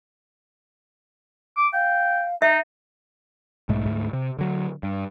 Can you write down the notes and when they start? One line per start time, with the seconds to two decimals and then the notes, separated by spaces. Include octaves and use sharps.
1.57 D6
1.73 F5 G5
2.42 D#4 E5
3.69 B1 G#2 G#3 A3
3.85 D2 G#2 A3
4.13 C3
4.39 D3 F#3
4.83 G2